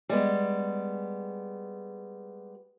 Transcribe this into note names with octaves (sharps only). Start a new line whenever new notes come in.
G3 G#3 B3